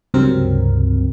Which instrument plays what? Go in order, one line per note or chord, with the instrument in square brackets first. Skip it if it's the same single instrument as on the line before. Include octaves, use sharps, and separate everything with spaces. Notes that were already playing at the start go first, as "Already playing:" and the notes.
[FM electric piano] C#2 G2 C3 F#3 C4 A#4